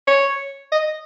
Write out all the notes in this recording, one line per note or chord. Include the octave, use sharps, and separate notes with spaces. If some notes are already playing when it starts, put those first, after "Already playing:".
C#5
D#5